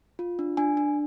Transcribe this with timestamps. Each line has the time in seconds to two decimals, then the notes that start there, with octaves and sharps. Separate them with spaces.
0.19 F4
0.39 D4
0.57 D4 G#5
0.77 D4